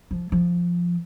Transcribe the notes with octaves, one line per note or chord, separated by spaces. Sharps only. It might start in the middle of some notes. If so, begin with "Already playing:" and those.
F3
F3